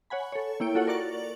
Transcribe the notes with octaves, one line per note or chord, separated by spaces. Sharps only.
C#5 F#5 G#5 B5
A4 C#5
A#3 E4 C#5 G5 D7
F4 F#4 A4 C#5 F#5
A#4 D5 C#6 A6 F#7